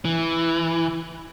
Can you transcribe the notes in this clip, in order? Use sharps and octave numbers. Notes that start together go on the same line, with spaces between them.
E3